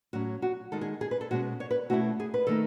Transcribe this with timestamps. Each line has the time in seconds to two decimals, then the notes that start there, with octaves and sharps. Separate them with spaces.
0.13 A2 F#3 C#4 F#4
0.42 F#4
0.72 D#3 G#3 D#4 A4
0.81 G#4
1.01 G#4
1.11 B4
1.21 A4
1.31 B2 G#3 C#4 F#4
1.60 C#5
1.71 B4
1.90 B2 A3 C#4 E4 F#4
2.20 G#4
2.34 B4
2.47 D#3 A3 D#4 A4